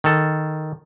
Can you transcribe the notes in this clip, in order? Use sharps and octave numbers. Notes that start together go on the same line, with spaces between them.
D#3 A4